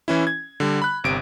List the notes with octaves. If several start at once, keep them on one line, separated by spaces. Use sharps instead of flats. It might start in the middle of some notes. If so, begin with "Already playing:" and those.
E3 C#4 E4
G#6
D3 G3
B5 F#6
G1 C3 D7